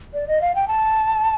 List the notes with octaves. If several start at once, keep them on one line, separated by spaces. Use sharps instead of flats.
D5
D#5
F5
G5
A5